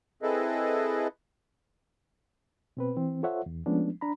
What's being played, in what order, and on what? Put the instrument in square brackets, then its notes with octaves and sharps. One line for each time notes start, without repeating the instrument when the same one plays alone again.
[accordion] C4 E4 G#4 A4 B4 D#5
[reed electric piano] B2 C4 B4
E3 C4
F4 A4 C5 C#5 E5 F#5
E2
F3 G#3 A3 B3 C#4 D4
D4 A#5 B5